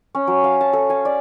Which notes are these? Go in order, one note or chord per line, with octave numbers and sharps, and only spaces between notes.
C#4
F#3
F5
A5
A4
G#5
D5